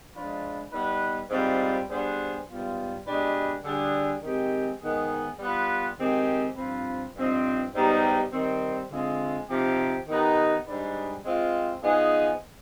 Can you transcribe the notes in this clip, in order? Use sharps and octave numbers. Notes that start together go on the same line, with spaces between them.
F3 G#3 D4 F4 B4
G3 B3 D#4 B4
G#2 G3 C4 F4 B4
G3 B3 D4 G#4 C5
G#2 G3 B3 F4
B2 G#3 D4 G4 B4
D3 G3 D4 G#4
D#3 G#3 C4 G4
G#2 D#3 B3 D#4 G#4
G3 B3 F4 B4
D#3 G#3 C4 G4
G2 F3 C4 F4 B4
G2 F3 C4 D#4
G#2 G3 B3 D#4 G4
D#3 G3 C4
D3 G#3 C4 F4 G#4
C3 F3 C4 D#4 G4
D#3 B3 D#4 G4 B4
G#2 G3 D4 G#4 B4
G#3 C4 F4
F3 B3 D#4 G#4